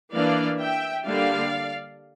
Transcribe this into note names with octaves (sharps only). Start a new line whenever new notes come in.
E3 A#3 D4 D5 F5
E5 G5
D3 G3 A#3 D4 D5 F5